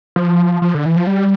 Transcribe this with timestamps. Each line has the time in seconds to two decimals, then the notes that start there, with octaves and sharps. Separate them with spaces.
0.16 F3
0.62 F3
0.75 D3
0.86 E3
0.96 F3
1.07 G3